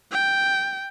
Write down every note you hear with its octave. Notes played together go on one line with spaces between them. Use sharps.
G5